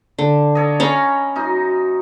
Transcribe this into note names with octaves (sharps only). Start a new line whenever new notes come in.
D3
A4 C#5 D#5
C#4 F5 A#5 B5 C#6
F#2 D#4 A#5